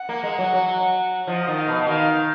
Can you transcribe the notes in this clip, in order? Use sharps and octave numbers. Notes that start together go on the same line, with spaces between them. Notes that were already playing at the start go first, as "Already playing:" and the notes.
Already playing: F#5
A#3
G#3
F#3
F#3
F3 D#5
D#3
F5
B2
D#3 F5